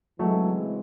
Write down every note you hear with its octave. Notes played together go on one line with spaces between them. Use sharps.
C#3 E3 F#3 G#3 A3 C4